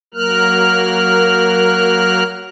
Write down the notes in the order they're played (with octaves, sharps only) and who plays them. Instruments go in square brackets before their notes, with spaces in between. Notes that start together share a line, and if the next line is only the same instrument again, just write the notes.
[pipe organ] F#3 A#3 A#4 F6 F#6